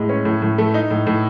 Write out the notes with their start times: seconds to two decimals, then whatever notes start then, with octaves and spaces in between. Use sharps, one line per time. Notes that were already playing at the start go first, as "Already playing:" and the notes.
Already playing: A2 G#3
0.09 C#4
0.25 A2
0.42 A2
0.58 A3
0.74 D#4
0.91 A2
1.07 A2